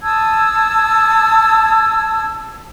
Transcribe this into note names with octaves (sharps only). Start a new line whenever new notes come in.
A5 D#6 E6 G#6